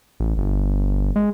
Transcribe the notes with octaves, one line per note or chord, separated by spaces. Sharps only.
A1
G1
G#3